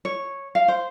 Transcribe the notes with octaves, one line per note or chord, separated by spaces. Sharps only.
C#5
F5
C5